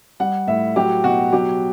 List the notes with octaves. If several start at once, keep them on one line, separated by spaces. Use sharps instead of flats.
G3 F#5
A2 E5
F#3 G4
B2 F#4
F#3 G4